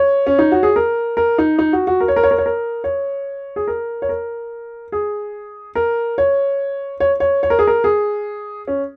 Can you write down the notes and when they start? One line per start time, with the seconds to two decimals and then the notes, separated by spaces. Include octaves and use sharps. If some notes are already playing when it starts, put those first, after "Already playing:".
Already playing: C#5
0.26 C#4
0.39 D#4
0.52 F#4
0.63 G#4
0.76 A#4
1.17 A#4
1.38 D#4
1.59 D#4
1.73 F#4
1.87 F#4
2.01 A#4
2.08 C#5
2.16 A#4
2.23 C#5
2.31 A#4
2.38 C#5
2.46 A#4
2.84 C#5
3.56 G#4
3.68 A#4
4.02 C#5
4.09 A#4
4.92 G#4
5.75 A#4
6.18 C#5
7.00 C#5
7.20 C#5
7.43 C#5
7.50 A#4
7.59 G#4
7.67 A#4
7.84 G#4
8.67 C#4